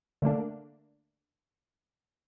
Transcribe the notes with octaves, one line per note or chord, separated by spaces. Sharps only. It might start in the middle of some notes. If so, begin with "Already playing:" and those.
D3 A3 A#3 D4